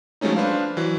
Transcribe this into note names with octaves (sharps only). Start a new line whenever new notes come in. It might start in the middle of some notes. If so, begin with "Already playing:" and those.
F3 F#3 G#3 A3 C#4 D#4
D4 B4 C5 F5
E3 F#3